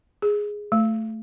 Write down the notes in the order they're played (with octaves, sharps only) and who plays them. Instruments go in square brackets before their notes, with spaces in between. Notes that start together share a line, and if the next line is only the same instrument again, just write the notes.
[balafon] G#4
A3